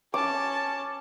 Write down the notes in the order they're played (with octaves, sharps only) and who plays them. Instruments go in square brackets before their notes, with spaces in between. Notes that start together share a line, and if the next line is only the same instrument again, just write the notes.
[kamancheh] C#4 A5 [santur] D6